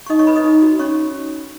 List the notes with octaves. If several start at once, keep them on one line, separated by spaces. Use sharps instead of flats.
C#6
D#4 D#5 D#6
C#5 C#6
B4 B5
D#5 D#6
D#4
F#4
C#4 C#5 C#6